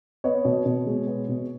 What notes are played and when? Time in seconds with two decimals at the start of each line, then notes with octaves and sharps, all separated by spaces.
0.24 B3 C#5 D#5
0.45 B2
0.66 B2
0.87 G#3
1.07 B3
1.29 B2